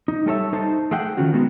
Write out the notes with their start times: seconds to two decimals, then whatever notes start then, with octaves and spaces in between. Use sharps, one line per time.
0.08 D#4
0.26 G3 A3 A4 C#5 E5
0.53 D#4 A4 C5 A5
0.91 A3 G#4 F#5 G5
1.17 D#3 F#3 C#4 F4 F#4
1.33 G#3 B3 D#4 F#4